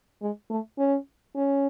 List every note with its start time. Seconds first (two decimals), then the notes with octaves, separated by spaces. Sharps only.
0.22 G#3
0.50 A3
0.78 C#4
1.35 C#4